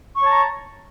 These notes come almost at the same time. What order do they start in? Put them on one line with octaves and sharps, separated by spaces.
C#6 C#5 A5 A#5